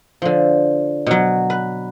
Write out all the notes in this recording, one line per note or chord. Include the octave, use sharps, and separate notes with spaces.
D3 F3
B2 F#3
B4